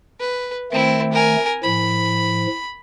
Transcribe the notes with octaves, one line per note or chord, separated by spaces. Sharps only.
B4
D#3 A3 C4 E4
A#4 G#5
A2 F3 B5